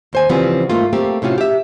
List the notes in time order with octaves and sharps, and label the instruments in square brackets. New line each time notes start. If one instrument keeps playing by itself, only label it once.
[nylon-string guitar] D#2 C5 G#5
C#3 E3 F3 G3 B3 C4
G#2 A3 A#3 F4
A3 A#3 C4 G4
A2 C3 C#4 F4 F#4
G4 E5